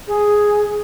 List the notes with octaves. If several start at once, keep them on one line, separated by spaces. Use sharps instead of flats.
G#4